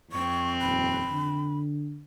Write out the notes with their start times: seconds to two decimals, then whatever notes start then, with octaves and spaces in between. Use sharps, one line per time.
0.12 F2 C4 C#6
0.61 D#1 B5
1.10 D3